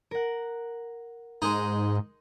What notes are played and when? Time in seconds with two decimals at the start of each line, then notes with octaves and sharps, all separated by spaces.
0.11 A#4 F#5
1.42 G#2 G#3 D#4